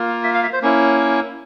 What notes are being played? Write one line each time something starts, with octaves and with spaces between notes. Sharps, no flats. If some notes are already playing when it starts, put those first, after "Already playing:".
Already playing: A#3 F4
E5
F5
E5
C5
A#3 C#4 E4